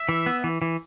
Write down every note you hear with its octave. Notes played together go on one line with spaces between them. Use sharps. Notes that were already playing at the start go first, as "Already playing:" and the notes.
Already playing: E5
E3
B3
E3
E3